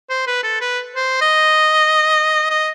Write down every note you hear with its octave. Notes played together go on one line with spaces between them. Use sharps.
C5
B4
A4
B4
C5
D#5
D#5